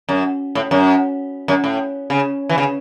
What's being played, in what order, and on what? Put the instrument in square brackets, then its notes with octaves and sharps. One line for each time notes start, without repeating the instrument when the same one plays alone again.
[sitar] F#2
A2
F#2
F#2
A2
C#3
E3
C#3